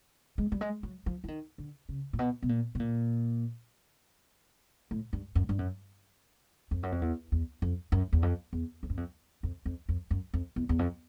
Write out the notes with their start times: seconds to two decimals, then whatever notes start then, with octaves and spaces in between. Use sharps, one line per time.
0.38 G#3
0.52 G3
0.61 G#3
0.83 F#3
1.06 F3
1.24 E3
1.28 D#3
1.58 D3
1.89 C#3
2.13 A#2
2.19 B2
2.42 B2
2.49 A#2
2.75 B2
2.79 A#2
4.91 A2
5.13 G2
5.35 F#2
5.49 G2
5.59 F#2
6.71 F2
6.83 F#2
6.92 F2
7.01 E2
7.32 E2
7.62 F2
7.92 F#2
8.13 E2
8.23 F2
8.53 E2
8.83 F2
8.90 F#2
8.97 F2
9.43 F2
9.66 F2
9.89 F2
10.11 F#2
10.34 F2
10.56 E2
10.69 E2
10.79 F2